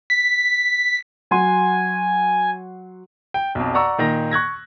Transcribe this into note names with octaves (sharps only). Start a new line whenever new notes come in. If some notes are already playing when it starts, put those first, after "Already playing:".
B6
F#3 F#5 G#5 C6
G5
B1 F2
D5 F#5 A#5 C#6 E6
A#2 D#3 A#5 A#6
C#6 F#6 G#6 A#6